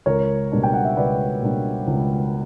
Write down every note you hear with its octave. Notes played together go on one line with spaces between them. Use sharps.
C#2 A#4 C#5
B2 G3 A#3 D4
G5
F#5
E5
C#2 B4 D5
B2 G3 A#3 D4
C#2